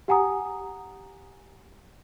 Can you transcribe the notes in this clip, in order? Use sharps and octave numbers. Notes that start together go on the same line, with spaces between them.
G4 F#5 G#5 A#5 D#6